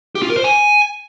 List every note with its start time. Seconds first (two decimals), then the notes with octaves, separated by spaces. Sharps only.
0.15 G4
0.23 F4
0.30 A#4
0.37 C5
0.44 G#5